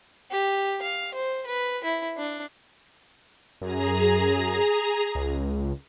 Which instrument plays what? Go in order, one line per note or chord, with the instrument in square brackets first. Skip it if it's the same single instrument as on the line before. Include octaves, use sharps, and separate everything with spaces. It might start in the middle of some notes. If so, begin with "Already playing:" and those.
[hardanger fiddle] G4
F5
C5
B4
E4
D4
[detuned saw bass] F#2 [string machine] G#4 A#5
[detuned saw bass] C#2